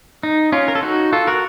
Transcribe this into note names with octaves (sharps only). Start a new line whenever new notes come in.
D#4
C#4 F4
A#4
A4
D#4 F#4
F4 A4
F#4 A#4